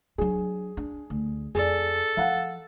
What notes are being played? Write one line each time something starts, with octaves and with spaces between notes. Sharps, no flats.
F#3 D4 G#4
D4
D2
F2 G#4 A4 D5
F3 F5 F#5